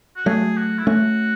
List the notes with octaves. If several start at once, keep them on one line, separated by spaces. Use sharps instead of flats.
F#4
F#3 A3 G#4
F#4
E4
A3 C#4 F#4